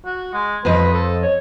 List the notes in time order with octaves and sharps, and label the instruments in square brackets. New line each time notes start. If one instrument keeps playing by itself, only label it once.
[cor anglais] F#4
G#3
[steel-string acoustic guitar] F2 F3 D#5 [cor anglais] B4
[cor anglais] A4
C#5